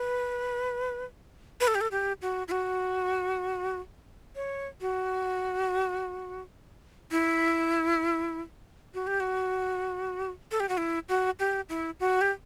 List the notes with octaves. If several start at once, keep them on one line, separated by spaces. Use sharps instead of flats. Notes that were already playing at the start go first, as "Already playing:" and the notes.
Already playing: B4
B4
A4
G4
A4
G4
F#4
E4
F#4
C#5
F#4
E4
F#4
G4
F#4
A4
G4
F#4
E4
F#4
G4
E4
F#4
G4